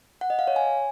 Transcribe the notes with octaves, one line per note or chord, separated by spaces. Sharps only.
F#5
D#5
F5
C#5
G#5